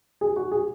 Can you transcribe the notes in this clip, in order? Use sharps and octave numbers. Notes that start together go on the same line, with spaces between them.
G#4
F#4
G#4